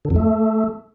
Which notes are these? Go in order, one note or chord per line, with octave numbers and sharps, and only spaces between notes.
D3
F2
A3